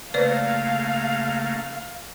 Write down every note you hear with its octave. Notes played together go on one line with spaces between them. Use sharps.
C#3 A3 A#3 B4 C5 D5 F5